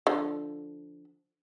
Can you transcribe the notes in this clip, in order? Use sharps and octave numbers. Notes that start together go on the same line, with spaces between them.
D3 F3